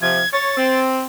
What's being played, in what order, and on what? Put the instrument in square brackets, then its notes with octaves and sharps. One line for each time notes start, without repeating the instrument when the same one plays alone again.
[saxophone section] C3 F3 [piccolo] G#6
[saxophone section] C#5 [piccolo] A6
[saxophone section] C4